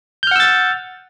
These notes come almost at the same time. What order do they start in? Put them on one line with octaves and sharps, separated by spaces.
G6 F6 F#5 E6 A6